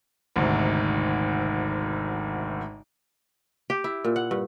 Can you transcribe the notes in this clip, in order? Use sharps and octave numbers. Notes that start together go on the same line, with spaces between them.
G#1 D2 G#2 C3
G4
E4
A#2
F#5
G2